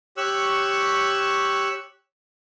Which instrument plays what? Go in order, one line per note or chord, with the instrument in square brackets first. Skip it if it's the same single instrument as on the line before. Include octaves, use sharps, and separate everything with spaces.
[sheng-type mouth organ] G4 C#5 C#6 E6 F#6